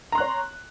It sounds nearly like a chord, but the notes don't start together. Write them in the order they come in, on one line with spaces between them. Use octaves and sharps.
A#5 C6 F#6 C#5